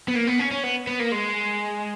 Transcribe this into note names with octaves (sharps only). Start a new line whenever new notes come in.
B3
A#3
B3
C#4
C#4
B3
B3
A#3
G#3